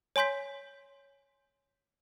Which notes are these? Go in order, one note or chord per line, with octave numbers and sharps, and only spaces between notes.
C#5 G#5 C6 G6 B6